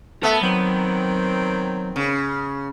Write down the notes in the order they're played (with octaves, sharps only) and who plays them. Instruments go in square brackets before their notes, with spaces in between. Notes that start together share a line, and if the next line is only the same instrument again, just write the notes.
[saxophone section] A3 [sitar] B3 [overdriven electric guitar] A#4 A5
[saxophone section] D#3 C4 [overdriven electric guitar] F#3
[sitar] C#3